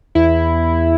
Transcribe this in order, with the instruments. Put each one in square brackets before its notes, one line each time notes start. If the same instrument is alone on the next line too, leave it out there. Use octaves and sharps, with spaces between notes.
[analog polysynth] E2 E4